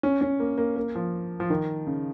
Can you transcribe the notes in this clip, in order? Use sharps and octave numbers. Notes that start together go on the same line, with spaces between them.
C#4
C#4
A#3
A#3
A#3
F3
F3
D#3
C#3